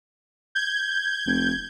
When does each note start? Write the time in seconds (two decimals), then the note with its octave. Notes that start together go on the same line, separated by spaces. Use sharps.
0.55 G6 G#6
1.26 F1